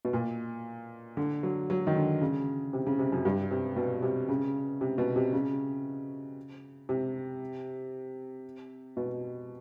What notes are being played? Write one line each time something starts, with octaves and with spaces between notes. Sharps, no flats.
B2
A#2
D3
F#3
F#3
D#3
D3
C#3
C3
C#3
C3
F#2
G2
C3
B2
C3
C#3
C3
B2
C3
C#3
C3
B2